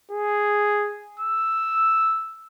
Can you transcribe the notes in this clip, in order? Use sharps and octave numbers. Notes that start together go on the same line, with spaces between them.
G#4
E6